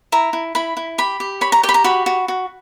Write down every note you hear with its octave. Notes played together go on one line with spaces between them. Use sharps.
E4 A#5
E4
E4 B5
E4
G4 B5
G4
C#5 B5
A#5
G4 G5
B5
A#5
F#4 B5
F#4
F#4